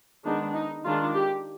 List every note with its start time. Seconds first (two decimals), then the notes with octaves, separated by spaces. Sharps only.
0.25 D#3 G#3 B3 D4 D#4
0.54 D#4
0.85 D#3 G#3 D4 F4
1.15 G4